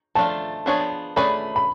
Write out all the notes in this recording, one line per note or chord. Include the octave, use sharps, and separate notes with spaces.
F3 A3 D4 F4 A5
F3 B3 D4 G#4 C#5
A3 C#4 G#4 B4 D5 B5
B5